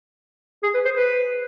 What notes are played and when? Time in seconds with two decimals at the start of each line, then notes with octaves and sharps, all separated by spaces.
0.63 G#4
0.74 B4
0.85 C5
0.96 B4